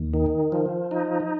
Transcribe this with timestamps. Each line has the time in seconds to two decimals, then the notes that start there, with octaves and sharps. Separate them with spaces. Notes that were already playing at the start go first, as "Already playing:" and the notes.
Already playing: D#2
0.14 D#3
0.52 F3
0.91 D#4